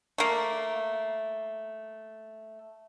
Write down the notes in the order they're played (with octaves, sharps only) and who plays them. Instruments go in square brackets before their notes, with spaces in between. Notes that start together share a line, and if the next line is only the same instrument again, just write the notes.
[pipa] A3 A#3